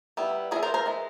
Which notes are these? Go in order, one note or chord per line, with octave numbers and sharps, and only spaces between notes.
G3 B3 E4
G3 B3 E4 G#4 A#4
A#4 C5
A#4 C5
E3 G#3